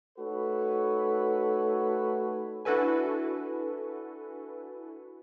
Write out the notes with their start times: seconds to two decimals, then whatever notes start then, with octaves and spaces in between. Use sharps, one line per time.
0.18 A3 D#4 F#4 A4 B4 C#5
2.65 D4 E4 F#4 A4 B4 G#5